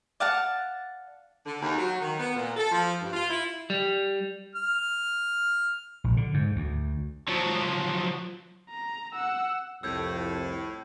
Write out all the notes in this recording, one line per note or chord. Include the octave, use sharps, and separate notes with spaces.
D5 F5 F#5 A5
D3
D#2
F#3
D#3
B3
A#2
A4
F3
G2
F4
E4
G3
F6
A#1
D3
G#2
D2
F3 F#3
A#5
F#5 E6
C2 F2 A2 E6 G6 G#6